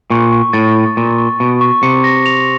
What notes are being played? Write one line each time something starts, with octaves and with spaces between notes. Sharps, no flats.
A#2 C#6
C#6
A2 A6
A6
A#2 A6
C#6
B2 C#6
C#6
C3 C#7
A#6
F7